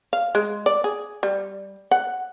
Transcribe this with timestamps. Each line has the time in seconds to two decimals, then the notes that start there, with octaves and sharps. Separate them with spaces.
0.13 F5
0.35 G#3
0.66 D5
0.84 G#4
1.23 G3
1.91 F#5